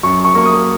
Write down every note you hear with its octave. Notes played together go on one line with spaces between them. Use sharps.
F#2 C#6
C#6
A#3 C#6
D#6